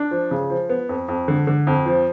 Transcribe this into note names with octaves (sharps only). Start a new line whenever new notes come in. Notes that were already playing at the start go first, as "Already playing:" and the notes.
Already playing: D4
F3
C#3
F3
B3
F2
F2
D3
D3
F2
F3